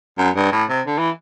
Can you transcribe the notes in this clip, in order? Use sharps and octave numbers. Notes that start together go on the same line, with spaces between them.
F#2
G2
A2
C3
D3
E3